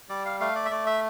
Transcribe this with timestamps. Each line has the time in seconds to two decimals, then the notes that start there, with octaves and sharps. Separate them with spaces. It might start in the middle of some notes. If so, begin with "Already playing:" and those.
0.09 G3 D5
0.26 F5
0.40 A3 F5
0.55 D5
0.65 E5
0.70 A3 D5
0.86 E5